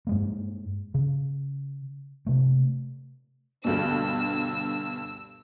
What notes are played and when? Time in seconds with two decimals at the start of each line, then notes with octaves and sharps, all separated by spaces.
0.07 G2 G#3 A#3
0.94 C#3
2.26 C3 A3
3.65 D2 G2 B2 E6